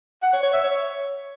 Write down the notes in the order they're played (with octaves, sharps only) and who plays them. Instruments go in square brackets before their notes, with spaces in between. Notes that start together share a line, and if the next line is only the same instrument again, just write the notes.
[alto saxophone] F#5
C#5
C#5
E5
C#5